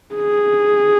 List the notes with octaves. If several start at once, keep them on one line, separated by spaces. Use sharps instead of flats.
G#4